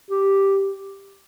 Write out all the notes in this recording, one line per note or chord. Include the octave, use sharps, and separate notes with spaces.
G4